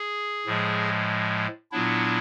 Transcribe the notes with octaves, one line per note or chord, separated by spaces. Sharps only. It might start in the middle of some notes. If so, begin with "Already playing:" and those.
Already playing: G#4
A2 F3 G#3
A#2 F#3 B3 D4 E4